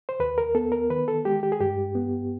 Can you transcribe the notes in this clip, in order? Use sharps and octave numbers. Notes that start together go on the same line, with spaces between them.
C5
D#2 B4
A#4
B3 A4
A#4
D#3 B4
A4
G#3 G4
G4
G#4
G2 G4
B3